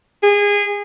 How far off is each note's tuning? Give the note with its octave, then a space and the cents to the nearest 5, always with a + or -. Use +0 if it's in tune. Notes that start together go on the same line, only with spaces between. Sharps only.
G#4 -25